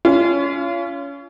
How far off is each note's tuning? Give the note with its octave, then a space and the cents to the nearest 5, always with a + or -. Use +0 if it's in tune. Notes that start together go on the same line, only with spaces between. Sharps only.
C#4 +25 F4 -30